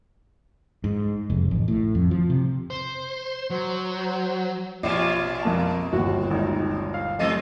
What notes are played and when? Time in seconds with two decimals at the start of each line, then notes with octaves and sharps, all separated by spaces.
0.84 G#2
1.30 F1
1.51 A1
1.68 A2
1.95 F2
2.11 F3
2.30 C3
2.70 C5
3.50 F#3 C5
4.83 A#1 B2 C#4 F4
5.43 F2 A#3 A5
5.93 G1 D#2 F#4
6.31 G#1 D#4
6.94 F5
7.19 F#3 A3 C4 A4 D#5